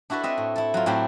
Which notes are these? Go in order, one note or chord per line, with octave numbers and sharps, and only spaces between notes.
D4 E4 F#4 A4 B4
C4 F#4 D#5 E5
A2
E4 A4
F#3 F4
A2 F#3 C4 E4 G4